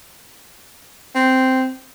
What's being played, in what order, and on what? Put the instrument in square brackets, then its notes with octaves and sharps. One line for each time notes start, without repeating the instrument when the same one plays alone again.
[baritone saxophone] C4